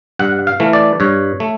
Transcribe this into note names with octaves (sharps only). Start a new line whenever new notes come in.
G2 F#5
F5
E3 A3
D5
G2 C#5
A3